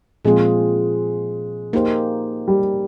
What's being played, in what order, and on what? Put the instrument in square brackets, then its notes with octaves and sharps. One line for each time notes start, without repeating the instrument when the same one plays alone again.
[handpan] A#2 F3 C4 F4 G#4 [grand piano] G#3
[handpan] A#3 D#4 G4 C5
[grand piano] G3